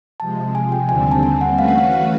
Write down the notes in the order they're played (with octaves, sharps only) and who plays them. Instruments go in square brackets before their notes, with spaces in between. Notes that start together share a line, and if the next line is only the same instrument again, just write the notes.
[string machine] C3 F3 G#3 [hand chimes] A5
[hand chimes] G#5
G5
[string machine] D#2 D3 G3 C4 [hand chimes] G#5
[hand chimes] A5
G#5
F#5
[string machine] E3 A3 C#4 F#4 B4 [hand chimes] F5
[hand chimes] F#5
F5
F5